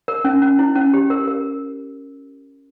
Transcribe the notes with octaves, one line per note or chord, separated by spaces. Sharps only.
A#4
C#4
C#4
E4
C#4
G4
A#4
A#4